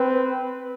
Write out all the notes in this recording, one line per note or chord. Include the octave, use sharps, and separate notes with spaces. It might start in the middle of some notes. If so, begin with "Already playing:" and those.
Already playing: C4 B4